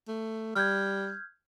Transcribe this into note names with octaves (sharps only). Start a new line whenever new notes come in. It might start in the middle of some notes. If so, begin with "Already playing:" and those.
A3
G3 F6 G6 G#6